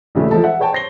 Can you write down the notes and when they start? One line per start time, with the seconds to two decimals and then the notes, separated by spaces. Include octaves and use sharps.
0.15 A#1 D#2 C#3 E3 A3
0.31 F3 G#3 A4
0.44 E5 F#5
0.59 G#4 B4 C#5 G5 A5
0.72 C5 C#5 A#6 C7 G7